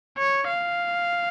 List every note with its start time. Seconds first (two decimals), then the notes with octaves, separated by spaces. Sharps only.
0.18 C#5
0.48 F5